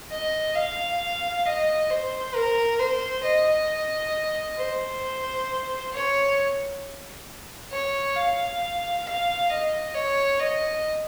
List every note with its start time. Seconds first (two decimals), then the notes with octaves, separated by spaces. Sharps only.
0.11 D#5
0.56 F5
1.45 D#5
1.90 C5
2.35 A#4
2.79 C5
3.24 D#5
4.58 C5
5.93 C#5
7.72 C#5
8.16 F5
9.05 F5
9.50 D#5
9.94 C#5
10.40 D#5